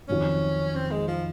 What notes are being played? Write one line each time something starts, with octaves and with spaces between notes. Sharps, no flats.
F2 D#3 F#3 C#4
C4
G#3
F3